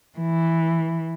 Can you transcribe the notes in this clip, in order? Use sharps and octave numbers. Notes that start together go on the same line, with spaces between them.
E3